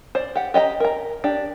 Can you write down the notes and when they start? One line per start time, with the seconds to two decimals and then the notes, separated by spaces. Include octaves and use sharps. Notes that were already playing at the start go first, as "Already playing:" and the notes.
0.15 C5 D5
0.35 G4 F#5
0.54 G4 D#5 F#5 A#5
0.80 A#4 A#5
1.24 D4 G4